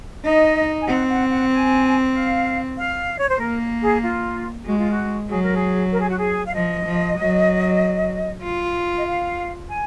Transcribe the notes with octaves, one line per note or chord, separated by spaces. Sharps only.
D#4 D#5
G#5
C4 F#5
F#5
F#5
G#5
F5
F5
C#5
C5
A#3 A#4
G#4
F4
G#3 F#4
F4
F#4
F#3 G#4
A#4
G#4
A#4
G#4
F#4
G#4
F5
F3 D#5
F3
F#3
F4
D#5
F5
G#5